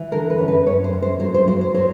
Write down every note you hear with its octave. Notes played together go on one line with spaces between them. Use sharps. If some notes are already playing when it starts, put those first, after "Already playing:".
Already playing: E3
D3 A#4
B4
F#2
B4
F#2 C#5
C5
F#2
C5
F#3 C5
C5
F#3 C5
C5
F#3 C5